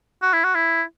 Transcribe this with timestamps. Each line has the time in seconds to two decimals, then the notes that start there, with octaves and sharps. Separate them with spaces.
0.22 F#4
0.33 E4
0.44 F#4
0.55 E4